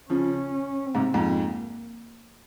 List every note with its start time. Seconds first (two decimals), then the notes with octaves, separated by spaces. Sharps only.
0.10 C#3 F3 C#4
0.86 C4
0.95 G#2 C3
1.14 F2 G#2
1.23 A#3